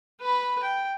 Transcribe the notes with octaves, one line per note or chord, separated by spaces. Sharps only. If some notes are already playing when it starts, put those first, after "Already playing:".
B4 B5
G5